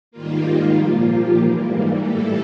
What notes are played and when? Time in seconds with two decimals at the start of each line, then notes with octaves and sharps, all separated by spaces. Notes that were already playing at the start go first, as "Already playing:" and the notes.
0.11 G#2 D#3 G3 A#3 F4
0.74 A#2 F3 A#3 F4
1.06 G4
1.37 G#2 E3 G3 A#3
1.99 A2 E3 G3 A4